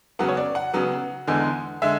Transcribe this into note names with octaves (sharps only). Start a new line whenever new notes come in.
C#3 F#3 B3 F#5
C#5
D5
F#5
C#3 F#3 B3
E2 D3 G#3
D3 G#3 E5